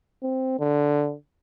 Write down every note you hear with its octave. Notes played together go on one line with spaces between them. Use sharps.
C4
D3